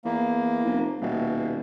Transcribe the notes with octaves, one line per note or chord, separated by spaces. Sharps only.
E2 A#3
F1
D#1 B2